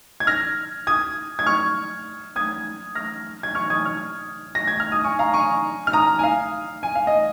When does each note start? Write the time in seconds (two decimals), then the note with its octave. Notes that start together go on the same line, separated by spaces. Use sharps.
0.20 G#6
0.27 F6 A#6
0.87 D#6 G#6
1.39 G#6
1.46 C#6 F6
2.36 D#6 G#6
2.95 F6 A#6
3.43 G#6
3.55 C#6 F6
3.70 D#6 G#6
3.85 C#6 F6
4.55 A#6
4.67 G#6
4.80 F6
4.92 D#6
5.04 G#5 C#6
5.19 F5 A#5
5.34 G#5 C#6
5.87 F6
5.93 A#5 D#6
6.19 G#5
6.23 F5
6.83 G#5
6.95 F5
7.07 D#5